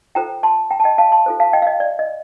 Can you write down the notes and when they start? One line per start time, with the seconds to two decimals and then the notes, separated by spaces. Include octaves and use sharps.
0.15 F4 A4 C5 G5 A#5
0.43 A5 C6
0.71 G5 A#5
0.80 A5
0.84 D#5 G5
0.98 F5 A5
1.12 A5 C6
1.26 F4 A4 C5
1.40 F5 A5
1.53 D#5 G5
1.62 F5
1.67 D#5
1.80 D5
1.99 D#5